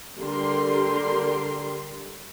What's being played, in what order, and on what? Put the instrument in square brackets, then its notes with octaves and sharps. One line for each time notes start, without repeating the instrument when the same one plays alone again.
[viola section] D3 G3 G4 A#4 C6